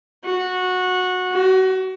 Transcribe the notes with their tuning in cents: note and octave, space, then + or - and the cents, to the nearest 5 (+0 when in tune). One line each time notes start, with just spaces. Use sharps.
F#4 -15
F#4 +30